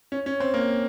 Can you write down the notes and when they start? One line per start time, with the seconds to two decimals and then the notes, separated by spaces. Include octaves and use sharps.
0.12 C#4
0.26 C#4
0.40 C4
0.54 A#3